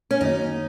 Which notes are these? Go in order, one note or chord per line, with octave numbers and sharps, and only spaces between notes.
C#4
F#2 D#3 A#3 D#4 F#4 D#5